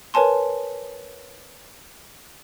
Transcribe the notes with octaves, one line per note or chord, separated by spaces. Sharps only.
A#4 B4 C#5 G#5 A5 C6